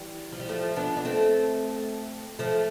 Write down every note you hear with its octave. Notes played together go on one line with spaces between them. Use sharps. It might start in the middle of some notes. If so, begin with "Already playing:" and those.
Already playing: E3 G3
F3
G3
F3 A3
B3 D4
D4
A3 C4
F3 A3